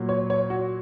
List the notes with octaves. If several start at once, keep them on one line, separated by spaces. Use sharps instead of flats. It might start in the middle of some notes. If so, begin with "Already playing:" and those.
Already playing: A#2 F#3
C#5
C#5
F#4